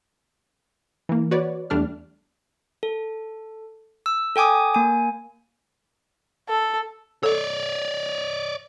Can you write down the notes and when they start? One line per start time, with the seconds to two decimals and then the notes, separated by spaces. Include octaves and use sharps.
1.09 E3 A#3
1.31 F#4 B4 C#5 D5
1.70 E2 G3 A3 D4 F6
2.83 A4
4.06 E6
4.36 A4 G5 G#5 D6 D#6
4.74 A#3 G#5
6.48 A4
7.23 A4 C#5 D5